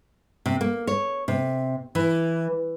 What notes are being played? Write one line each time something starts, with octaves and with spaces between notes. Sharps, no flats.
C3
A#3
C#5
C3
E3